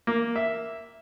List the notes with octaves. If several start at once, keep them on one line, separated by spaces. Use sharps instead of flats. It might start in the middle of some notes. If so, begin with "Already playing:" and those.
A#3
E5